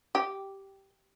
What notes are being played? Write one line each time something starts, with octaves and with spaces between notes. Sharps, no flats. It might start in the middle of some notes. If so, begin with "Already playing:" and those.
G4